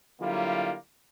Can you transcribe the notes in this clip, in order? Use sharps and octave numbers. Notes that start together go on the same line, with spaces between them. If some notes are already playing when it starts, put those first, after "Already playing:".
D3 F#3 G3 A#3 E4 F4